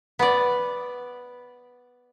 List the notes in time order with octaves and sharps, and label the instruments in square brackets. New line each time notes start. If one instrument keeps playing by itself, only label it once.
[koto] B3 D5